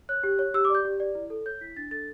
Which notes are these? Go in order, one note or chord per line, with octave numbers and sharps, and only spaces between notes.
C#5 F#6
G4
C#5
G4 E6
D6
D5 G6
G4
D5
E4
A4
C#5 G6
E4 B6
D4 A6
A4 A6